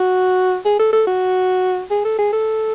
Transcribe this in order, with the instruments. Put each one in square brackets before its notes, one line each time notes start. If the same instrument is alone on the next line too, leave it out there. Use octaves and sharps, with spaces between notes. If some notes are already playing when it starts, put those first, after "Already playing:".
Already playing: [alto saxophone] F#4
G#4
A4
A4
F#4
G#4
A4
G#4
A4